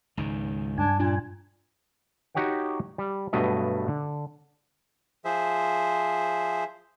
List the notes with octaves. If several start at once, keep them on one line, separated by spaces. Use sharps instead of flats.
C#2 G#2 D#3
G2 D4 G#5
A#2 D4
D#4 F#4 G4 C#5 F#5 G5
G3
G2 B2 F#3 A3 D#5
D3
F3 G#4 C5 E5